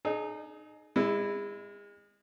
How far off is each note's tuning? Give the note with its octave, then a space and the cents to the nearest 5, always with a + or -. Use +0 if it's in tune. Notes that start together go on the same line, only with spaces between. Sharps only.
D#4 -25 G#4 +30
G#3 -35 E4 +0